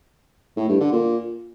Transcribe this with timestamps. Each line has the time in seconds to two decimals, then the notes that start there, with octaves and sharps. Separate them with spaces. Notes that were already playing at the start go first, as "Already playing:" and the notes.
0.57 A2
0.69 G2
0.80 D3
0.92 A#2